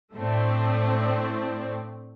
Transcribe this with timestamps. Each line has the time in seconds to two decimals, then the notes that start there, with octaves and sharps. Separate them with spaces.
0.15 A2 A3 C4 D4